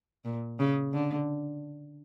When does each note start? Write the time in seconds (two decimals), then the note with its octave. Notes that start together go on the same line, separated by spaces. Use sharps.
0.25 A#2
0.59 C#3
0.93 D3